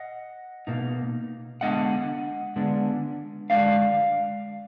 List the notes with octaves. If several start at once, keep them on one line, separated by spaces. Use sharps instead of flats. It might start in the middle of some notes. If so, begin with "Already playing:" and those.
Already playing: D#5 F#5
B2 A#3 D#4
D3 G#3 B3 D4 D#5 F#5
D3 G#3 B3 D4
D3 G#3 D4 D5 F5